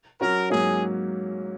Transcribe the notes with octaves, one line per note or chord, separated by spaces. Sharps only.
F#3 C#4 F#4 A#4
G#2 F#3 A#3 C#4 G#4